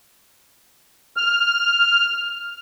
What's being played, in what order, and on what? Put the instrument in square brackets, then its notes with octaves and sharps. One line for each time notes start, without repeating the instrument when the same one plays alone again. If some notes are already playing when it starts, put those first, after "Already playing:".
[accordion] F6